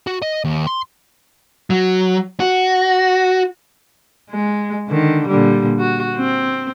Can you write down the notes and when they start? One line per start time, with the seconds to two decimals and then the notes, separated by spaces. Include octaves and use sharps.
0.07 F#4
0.22 D#5
0.45 D#2
0.67 C6
1.70 F#3
2.40 F#4
4.31 G#3
4.89 D3 D#3
5.27 A#2 D3 G3
5.79 F#4
6.17 C4